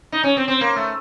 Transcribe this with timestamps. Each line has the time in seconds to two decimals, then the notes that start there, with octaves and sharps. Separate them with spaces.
0.12 D#4
0.24 C#4
0.37 C4
0.48 C4
0.61 A#3
0.76 A3